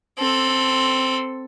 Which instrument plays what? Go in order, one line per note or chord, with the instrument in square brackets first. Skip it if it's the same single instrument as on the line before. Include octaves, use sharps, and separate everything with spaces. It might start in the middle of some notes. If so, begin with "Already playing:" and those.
[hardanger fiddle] C4 A4